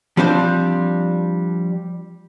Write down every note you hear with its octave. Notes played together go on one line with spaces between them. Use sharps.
F3 G3 C4 D4 C5